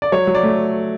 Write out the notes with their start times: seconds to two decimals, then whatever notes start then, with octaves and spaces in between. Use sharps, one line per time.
0.02 D5
0.12 F#3 C#5
0.27 F#3
0.35 D5
0.43 A3